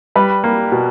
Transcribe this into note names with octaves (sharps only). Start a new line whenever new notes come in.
G3 B4
A#3
B2